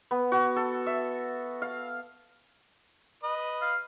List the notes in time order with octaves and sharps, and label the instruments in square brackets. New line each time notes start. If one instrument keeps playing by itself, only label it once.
[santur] B3
F#4
A4
E5
F5
[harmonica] B4 D#5
[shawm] F5